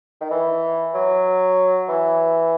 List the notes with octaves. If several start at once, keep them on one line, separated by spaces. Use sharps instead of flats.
D#3
E3
F#3
E3